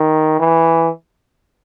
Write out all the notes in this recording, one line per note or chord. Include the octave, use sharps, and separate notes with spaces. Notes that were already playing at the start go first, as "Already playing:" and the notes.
Already playing: D#3
E3